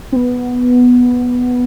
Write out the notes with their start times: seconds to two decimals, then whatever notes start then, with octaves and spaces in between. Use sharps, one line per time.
0.12 C4
0.16 B3